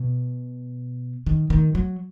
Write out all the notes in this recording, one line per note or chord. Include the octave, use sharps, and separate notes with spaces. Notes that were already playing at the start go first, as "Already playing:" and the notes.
Already playing: B2
D#3
D#3
F#3